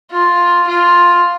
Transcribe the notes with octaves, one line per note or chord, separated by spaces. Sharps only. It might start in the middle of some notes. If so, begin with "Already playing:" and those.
F4
F4